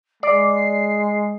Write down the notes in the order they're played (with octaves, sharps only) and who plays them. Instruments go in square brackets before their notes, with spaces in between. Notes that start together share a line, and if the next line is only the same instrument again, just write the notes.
[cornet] G#3 [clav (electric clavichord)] D5 [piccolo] C7